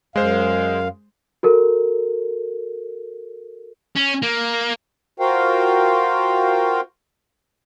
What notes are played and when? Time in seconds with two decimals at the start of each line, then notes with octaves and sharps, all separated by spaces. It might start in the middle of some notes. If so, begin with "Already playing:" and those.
0.16 F#2 G#3 C5 F5
1.43 F#4 A4 A#4
3.96 C#4
4.23 A#3
5.20 F4 F#4 A#4 C5 F5 G5